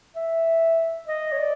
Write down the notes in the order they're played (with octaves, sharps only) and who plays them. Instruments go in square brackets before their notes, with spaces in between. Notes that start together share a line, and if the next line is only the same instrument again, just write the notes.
[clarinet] E5
D#5
C#5
D5